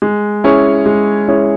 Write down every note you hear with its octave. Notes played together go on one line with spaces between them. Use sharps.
G#3
C#4 E4 G#4 C#5
G#3
C#4 E4 G#4 C#5